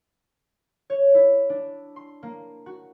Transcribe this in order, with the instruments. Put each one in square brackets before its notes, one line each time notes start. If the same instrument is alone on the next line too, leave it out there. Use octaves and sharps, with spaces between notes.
[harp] C#5
E4
D4
C6
A#3
F#4